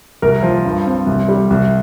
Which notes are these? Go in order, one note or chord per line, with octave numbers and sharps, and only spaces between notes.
C2 A#4
F3
G2
C4
C2
G3
C2